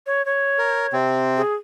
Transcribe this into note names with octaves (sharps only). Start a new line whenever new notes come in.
C#5
C#5
A#4
C3 C4
G#4